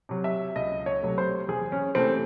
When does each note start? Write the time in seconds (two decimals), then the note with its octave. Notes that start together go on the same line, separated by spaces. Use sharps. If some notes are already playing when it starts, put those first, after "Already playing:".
0.09 C3 F#3
0.24 E5
0.56 C#2 D#5
0.86 C#5
1.02 C3 F#3 A3
1.18 C5
1.48 E2 G#4
1.72 C#4
1.95 C3 E3 A3 C4